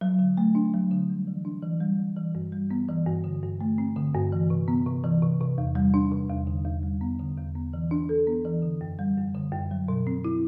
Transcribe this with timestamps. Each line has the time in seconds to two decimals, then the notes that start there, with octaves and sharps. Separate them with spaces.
0.01 F#3
0.19 D3
0.37 A3
0.55 D4
0.74 F#3
0.91 D3
1.10 G3
1.27 E3
1.45 D4
1.63 E3
1.81 G3
1.99 E3
2.17 E3
2.35 G2
2.52 G3
2.71 B3
2.88 E3
3.07 G2
3.24 D3
3.43 G2
3.60 A3
3.78 C4
3.96 D3
4.14 G2
4.32 E3
4.50 C3
4.68 B3
4.86 C3
5.04 E3
5.22 C3
5.40 C3
5.58 E2
5.75 G3
5.94 D4
6.12 C3
6.30 E2
6.47 D3
6.65 E2
6.83 G3
7.01 B3
7.19 D3
7.37 E2
7.55 B3
7.73 E3
7.91 D4
8.09 A4
8.27 B3
8.45 E3
8.62 D3
8.81 F#2
8.99 G3
9.17 F#2
9.35 D3
9.52 F#2
9.71 F#3
9.88 B2
10.07 C4
10.25 E4